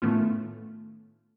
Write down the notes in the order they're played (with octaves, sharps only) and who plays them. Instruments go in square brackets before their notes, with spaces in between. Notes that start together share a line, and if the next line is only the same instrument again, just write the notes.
[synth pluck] A2 D#3 A3 B3 C#4 F4